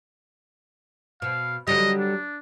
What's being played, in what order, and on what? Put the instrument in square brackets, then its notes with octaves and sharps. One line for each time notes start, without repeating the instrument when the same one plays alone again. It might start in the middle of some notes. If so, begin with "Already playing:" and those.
[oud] B2 [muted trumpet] F5
[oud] D3 F#3 G3 [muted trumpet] D#5
[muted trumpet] D4